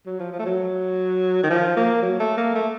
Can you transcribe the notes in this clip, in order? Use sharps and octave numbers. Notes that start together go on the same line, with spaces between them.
F#3
F3
F3
A3
F#3
D#3
F3
A#3
F#3
A3
A#3
A3